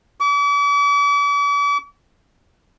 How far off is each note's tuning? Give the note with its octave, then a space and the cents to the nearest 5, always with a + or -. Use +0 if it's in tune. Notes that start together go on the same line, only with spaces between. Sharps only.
D6 -45